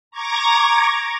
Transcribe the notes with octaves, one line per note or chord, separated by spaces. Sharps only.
A#5 C#6 D6 G#6 A#6